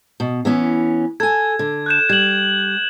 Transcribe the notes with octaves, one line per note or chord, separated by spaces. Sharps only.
B2
E3 B3 C#4
A4 G#5 G#6
D3
F#6 G6 E7
G3 G#6 F#7